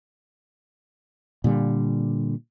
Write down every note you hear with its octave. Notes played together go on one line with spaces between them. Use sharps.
A#2 D3 G3